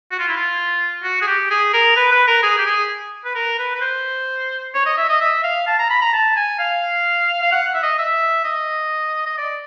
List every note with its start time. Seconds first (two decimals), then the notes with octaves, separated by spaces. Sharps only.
0.11 F#4
0.19 F4
0.28 E4
0.37 F4
1.04 F#4
1.22 G#4
1.27 G4
1.51 G#4
1.74 A#4
1.97 B4
2.11 B4
2.28 A#4
2.43 G#4
2.58 G4
2.66 G#4
3.25 B4
3.35 A#4
3.59 B4
3.75 B4
3.81 C5
4.75 C#5
4.86 D#5
4.98 E5
5.09 D#5
5.21 E5
5.44 F5
5.67 A5
5.79 A#5
5.90 B5
6.02 A#5
6.13 A5
6.36 G#5
6.59 F5
7.43 F5
7.52 F#5
7.75 E5
7.83 D#5
7.99 E5
8.45 D#5
9.26 D#5
9.38 D5